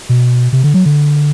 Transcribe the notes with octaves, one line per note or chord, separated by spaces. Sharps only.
B2
C3
D3
F#3
D3